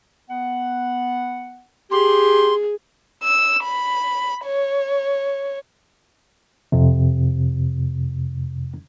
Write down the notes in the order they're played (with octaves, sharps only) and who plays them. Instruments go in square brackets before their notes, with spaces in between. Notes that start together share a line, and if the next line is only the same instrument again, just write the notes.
[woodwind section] B3 F#5
[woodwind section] G4 [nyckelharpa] G#4 [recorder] C6
[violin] E6
B5
C#5
[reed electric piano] F2 C3